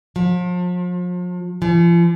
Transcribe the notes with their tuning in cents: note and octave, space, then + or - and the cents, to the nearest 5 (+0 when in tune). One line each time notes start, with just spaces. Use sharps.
F3 +40
F3 -40